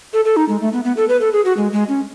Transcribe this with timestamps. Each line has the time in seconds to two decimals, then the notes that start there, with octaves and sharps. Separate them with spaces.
0.13 A4
0.25 A4
0.36 D#4
0.49 G#3
0.61 A3
0.73 B3
0.84 B3
0.97 A4
1.08 B4
1.21 A4
1.33 G#4
1.45 F#4
1.57 G#3
1.73 G#3
1.89 C#4